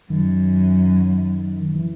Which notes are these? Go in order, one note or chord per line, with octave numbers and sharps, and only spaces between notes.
F#2 D#3
E3